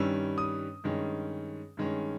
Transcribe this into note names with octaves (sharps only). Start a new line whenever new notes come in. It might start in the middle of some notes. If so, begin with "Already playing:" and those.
Already playing: G2 D#3 G3 C#4 E6
D#6
G2 D#3 G#3 C#4
G2 D#3 G#3 C#4